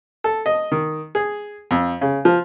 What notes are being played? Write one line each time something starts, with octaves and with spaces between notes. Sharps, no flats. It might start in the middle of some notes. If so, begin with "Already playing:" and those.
A4
D#5
D#3
G#4
F2
C#3
F3